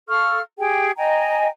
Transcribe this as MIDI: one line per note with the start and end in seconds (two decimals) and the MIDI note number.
0.08 0.40 69
0.08 0.40 77
0.08 0.40 85
0.08 0.40 89
0.58 0.91 67
0.58 0.91 68
0.58 0.91 79
0.96 1.48 75
0.96 1.48 79
0.96 1.48 80
0.96 1.48 82